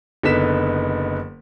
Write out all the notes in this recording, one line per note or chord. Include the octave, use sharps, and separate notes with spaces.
F#1 D3 B3 D#4 B6 E7